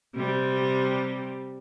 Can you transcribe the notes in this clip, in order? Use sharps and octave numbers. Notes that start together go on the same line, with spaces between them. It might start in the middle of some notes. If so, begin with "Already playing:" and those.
C3 G3